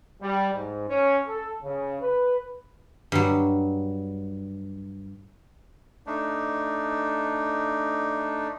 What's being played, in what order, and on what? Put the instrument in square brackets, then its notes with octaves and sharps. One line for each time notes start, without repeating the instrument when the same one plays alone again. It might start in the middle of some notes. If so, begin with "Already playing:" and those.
[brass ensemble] G3
G#2
C#4
A4
C#3
B4
[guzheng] G2 F#3
[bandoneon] A3 D4 D#4